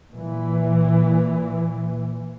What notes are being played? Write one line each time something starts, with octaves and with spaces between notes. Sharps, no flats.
A#2 E3